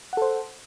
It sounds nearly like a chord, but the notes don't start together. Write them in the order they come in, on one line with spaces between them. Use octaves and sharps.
F#5 A4 C5